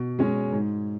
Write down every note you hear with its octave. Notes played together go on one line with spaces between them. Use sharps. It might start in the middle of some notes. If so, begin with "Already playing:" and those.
Already playing: B2
G#3 C#4
G#2